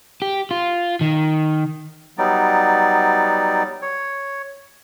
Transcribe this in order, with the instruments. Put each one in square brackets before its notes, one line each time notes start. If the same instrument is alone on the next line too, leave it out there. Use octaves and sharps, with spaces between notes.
[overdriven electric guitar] G4
F4
D#3
[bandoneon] F#3 G3 B3 D#4 D5
C#5